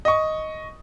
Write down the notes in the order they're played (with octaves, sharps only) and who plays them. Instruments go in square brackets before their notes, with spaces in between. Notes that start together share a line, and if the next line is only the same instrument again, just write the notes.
[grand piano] D#5 C#6